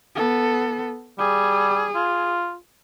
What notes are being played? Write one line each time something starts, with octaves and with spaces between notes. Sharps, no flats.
B3 A4
G3 G#4
F4